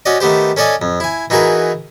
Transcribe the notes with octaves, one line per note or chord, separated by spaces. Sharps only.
C#4 F#4 D5 D#5
D#3 A3 B3 G4 C5
C#4 A4 D5 D#5 G#5
F2
E4 G#5
E3 D#4 F#4 G#4 A#4 B4